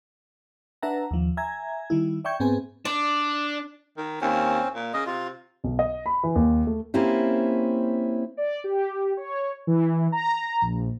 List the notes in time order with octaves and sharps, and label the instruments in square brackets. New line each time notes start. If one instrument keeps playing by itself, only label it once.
[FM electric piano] D4 B4 E5 F#5 A5 A#5
D#2 F3
E5 G#5 A#5 G#6
D#3 G3 E4
D5 E5 G5 C#6 G6 G#6
G#2 B3 C4 G#4 G#5
[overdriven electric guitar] D4 [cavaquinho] D5
[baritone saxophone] D#3
[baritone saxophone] D#2 [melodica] C4 C#4
[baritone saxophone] A#2
[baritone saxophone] C#3 [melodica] D#5
[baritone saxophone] C3 [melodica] F4
[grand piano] B1
D#5
B5
E3
D#2
A3
[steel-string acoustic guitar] A#3 C4 C#4 E4 G4
[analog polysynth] D5
G4
C#5
E3
A#5
A#1